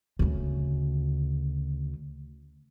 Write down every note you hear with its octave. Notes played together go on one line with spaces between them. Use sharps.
D2 C#3